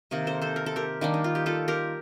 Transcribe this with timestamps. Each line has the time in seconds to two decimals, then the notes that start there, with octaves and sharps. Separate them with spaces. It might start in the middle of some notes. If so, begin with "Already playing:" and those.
0.11 C3 D#3 A#3
0.27 A4 C5
0.41 A4 C5
0.56 A#4
0.66 A4
0.76 G4 A#4
1.01 D#3 G3 A#3 D4
1.14 D#4
1.24 F4
1.35 G4
1.46 F4 A4
1.68 G4 A#4